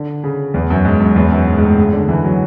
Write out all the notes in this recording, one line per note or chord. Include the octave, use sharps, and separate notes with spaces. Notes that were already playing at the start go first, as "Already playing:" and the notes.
Already playing: D3
C#3
E2
F#2
G#2
F#2
E2
F#2
G#2
G#2
A2
C#3
D3
E3
F#3